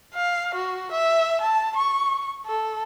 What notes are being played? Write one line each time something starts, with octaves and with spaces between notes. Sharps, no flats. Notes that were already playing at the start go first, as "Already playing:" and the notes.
F5
F#4
E5
A5
C#6
A4